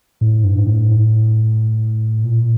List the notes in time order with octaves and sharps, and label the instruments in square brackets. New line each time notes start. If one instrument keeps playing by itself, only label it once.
[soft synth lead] A2
G2
A2
A#2